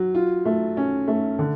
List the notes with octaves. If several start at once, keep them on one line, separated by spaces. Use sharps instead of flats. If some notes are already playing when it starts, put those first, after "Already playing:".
Already playing: F#3
F4
A3
C#4
A3
D3